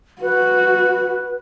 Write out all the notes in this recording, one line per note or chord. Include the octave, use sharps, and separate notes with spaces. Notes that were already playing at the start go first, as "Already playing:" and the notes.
F#4 B4